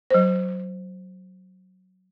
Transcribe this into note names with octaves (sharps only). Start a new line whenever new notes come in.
F#3 C5